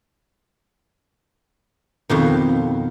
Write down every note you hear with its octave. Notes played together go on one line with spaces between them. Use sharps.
F2 B2 D#3